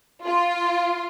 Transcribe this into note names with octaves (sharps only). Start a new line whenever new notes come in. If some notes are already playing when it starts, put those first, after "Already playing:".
F4